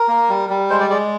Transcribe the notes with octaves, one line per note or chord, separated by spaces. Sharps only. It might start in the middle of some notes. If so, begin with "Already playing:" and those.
Already playing: A#4
A#3
G3
G3
G#3 C5
D5
G#3 D5